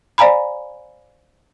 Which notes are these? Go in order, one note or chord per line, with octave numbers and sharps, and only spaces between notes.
C5 D5 F5 G#5 A#5 B5